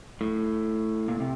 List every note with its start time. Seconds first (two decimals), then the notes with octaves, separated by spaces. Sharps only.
0.21 A2
1.08 A#2
1.20 C3